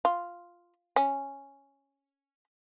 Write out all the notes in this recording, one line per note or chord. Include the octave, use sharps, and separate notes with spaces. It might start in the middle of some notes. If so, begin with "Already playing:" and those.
F4
C#4